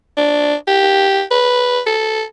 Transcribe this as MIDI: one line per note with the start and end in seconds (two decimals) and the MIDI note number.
0.17 0.55 62
0.67 1.22 67
1.31 1.80 71
1.86 2.23 69